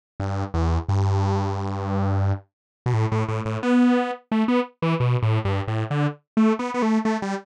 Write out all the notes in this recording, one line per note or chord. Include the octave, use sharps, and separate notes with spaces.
G2
E2
G2
B2
A2
A2
A2
A2
B3
A3
B3
E3
B2
A2
G2
A2
D3
A3
B3
B3
A3
A3
G3